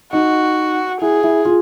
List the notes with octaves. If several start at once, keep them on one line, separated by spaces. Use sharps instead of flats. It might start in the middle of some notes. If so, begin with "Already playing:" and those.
D#4 F#4
E4 G#4
E4
F4